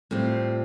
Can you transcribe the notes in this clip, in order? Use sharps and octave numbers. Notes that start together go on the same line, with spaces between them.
A2 G3 C4 F4